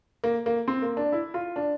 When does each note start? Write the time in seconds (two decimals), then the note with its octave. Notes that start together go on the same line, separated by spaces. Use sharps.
0.24 A#3
0.46 A#3
0.68 C4
0.82 A#3
0.97 D4
1.12 E4
1.34 F4
1.56 D4